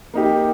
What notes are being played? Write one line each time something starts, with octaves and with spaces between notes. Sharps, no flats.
A#3 D#4 G4